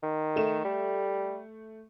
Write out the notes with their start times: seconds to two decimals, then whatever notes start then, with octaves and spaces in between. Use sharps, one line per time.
0.03 D#3
0.36 A3 E7
0.65 G3